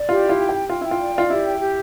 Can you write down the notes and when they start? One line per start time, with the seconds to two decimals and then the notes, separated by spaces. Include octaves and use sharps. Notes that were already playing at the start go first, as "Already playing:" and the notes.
Already playing: D5
0.09 F4 G4
0.23 E4
0.29 F4
0.39 G5
0.49 G4
0.55 G5
0.69 F4 G5
0.81 E4 G5
0.91 F4
0.99 D5
1.15 F4 D5
1.30 E4 G4
1.45 G5
1.60 G4